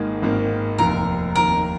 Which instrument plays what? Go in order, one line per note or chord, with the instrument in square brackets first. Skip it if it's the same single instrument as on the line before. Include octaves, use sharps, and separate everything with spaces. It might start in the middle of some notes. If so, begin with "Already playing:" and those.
Already playing: [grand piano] G#1 G#2 D#3 A#3 [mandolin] G#4
[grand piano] G#1 G#2 D#3 A#3
[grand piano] F1 D#2 D#3 [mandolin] A#4
[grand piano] F1 D#2 D#3 [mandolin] A#4